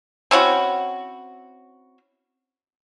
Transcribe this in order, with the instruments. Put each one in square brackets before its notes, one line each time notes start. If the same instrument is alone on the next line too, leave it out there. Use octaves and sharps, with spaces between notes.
[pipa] C4 C#4 E4 F#4